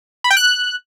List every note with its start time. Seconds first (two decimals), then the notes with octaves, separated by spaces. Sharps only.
0.24 B5
0.30 G5
0.37 F#6